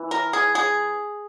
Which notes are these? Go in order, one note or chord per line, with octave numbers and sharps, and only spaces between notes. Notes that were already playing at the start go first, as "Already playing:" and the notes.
Already playing: E3
A#4
G#4
G#4